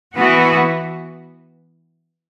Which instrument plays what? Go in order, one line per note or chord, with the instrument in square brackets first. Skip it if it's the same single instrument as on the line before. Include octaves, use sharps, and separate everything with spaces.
[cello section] E3 B3 F#4